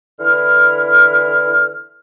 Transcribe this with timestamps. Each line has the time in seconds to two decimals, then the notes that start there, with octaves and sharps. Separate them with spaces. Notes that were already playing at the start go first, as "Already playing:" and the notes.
0.19 D3 E3 E4 F6